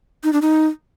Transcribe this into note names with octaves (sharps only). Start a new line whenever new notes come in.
D#4
D4
D#4